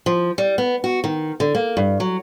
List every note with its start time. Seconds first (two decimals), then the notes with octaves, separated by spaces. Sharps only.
0.06 F3
0.38 G3
0.58 B3
0.84 F#4
1.04 D#3
1.40 D3
1.55 A#3
1.77 G2
2.00 F#3